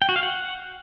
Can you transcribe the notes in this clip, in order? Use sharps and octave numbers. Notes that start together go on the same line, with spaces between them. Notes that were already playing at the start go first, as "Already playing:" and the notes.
G5
F#4
F5
F#5